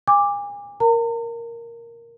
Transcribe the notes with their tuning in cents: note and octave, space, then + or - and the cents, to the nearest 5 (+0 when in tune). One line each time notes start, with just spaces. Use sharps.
G#5 -35 D6 +0
A#4 +0 A#5 -45